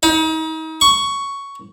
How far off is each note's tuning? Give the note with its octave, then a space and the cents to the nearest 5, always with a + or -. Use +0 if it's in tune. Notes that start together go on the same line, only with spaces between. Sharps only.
D#4 +35
C#6 +5